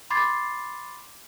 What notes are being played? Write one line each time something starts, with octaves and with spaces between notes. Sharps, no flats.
B5 C6 D6 G#6 A6 C7